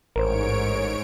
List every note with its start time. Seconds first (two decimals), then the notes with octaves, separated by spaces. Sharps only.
0.16 A1 G#2 A#4 C5 C#5 D7